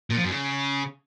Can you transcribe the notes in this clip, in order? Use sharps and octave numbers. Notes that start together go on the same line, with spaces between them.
A#2
F3
F#2
C#3